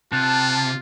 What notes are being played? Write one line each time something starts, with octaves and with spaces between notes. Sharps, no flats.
C3 F4 A5 F#6